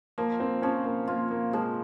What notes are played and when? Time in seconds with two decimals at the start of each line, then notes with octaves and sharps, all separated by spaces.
0.18 F3 A#3
0.40 C4
0.62 F3 C#4
0.85 A#3
1.08 A#3 F4
1.31 A#3
1.53 F3 G#3